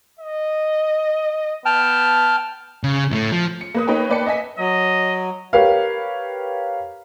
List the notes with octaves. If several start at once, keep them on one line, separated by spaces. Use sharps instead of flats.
D#5
B3 G5 A5 F6
C#3
A2 A3
F3
C#7
A#3 B4 D#6
A#3 D#4 B4 C#5 G5
A#3 B4 D5 G5 A5 C#7
D#5 E5 G#5 B6
F#3 D#5
G4 A#4 B4 C#5 F5